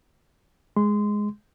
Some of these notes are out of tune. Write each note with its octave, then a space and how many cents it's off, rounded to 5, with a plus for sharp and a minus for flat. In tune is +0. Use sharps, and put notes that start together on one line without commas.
G#3 +0 C6 -20